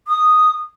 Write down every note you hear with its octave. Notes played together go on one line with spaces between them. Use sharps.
D#6